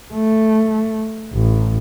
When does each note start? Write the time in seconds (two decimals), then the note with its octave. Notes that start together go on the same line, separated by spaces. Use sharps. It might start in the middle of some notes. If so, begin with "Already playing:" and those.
0.14 A3
1.34 A1